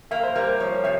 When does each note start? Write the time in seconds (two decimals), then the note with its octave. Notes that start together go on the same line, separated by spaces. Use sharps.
0.11 A#3 E5
0.23 C5
0.35 G3 A#4
0.48 C5
0.60 F3 C#5
0.84 C3 E5